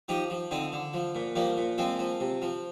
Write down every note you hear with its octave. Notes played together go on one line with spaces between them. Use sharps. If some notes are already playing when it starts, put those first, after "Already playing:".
F3 D#4 G4
F3
D3 C4 D#4
D3
F3
A#2
F3 G3 A#3
A#2
F3 G#3 C4
F3
C3
F3